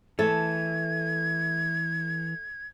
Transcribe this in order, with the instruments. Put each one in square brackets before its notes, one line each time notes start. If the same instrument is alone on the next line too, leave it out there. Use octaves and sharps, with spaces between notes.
[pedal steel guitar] E3 [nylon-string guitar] A3 A4 [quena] G#6